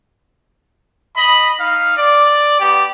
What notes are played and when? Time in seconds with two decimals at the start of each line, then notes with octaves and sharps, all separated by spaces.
1.15 D#5 B5
1.58 D#4 F5
1.96 D5
2.59 B3 G4